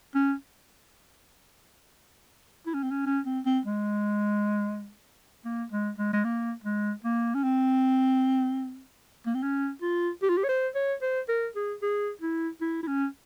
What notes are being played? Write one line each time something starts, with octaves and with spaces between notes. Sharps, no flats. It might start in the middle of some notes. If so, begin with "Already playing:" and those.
C#4
E4
C#4
C4
C#4
C#4
C4
C4
G#3
A#3
G#3
G#3
G#3
A#3
G#3
A#3
C#4
C4
A#3
C4
C#4
F4
G4
F4
G4
C#5
C5
C#5
C5
A#4
G#4
G#4
E4
E4
E4
C#4